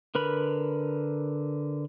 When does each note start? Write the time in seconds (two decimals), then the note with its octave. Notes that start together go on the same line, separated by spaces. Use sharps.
0.15 D3 A#4 B4 B5